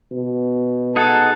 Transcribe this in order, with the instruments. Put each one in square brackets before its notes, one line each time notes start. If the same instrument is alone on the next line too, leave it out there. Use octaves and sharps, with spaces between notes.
[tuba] B2
[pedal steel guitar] D#4 G#4 F#5 [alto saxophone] A4